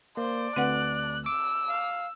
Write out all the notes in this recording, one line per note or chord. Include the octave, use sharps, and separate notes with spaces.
A#3 C5 D5
D2 C4 B4 F#5 F#6
D6 E6
F5